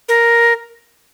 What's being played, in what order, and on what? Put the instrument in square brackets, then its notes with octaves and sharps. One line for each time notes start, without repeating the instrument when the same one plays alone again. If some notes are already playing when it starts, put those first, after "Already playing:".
[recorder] A#4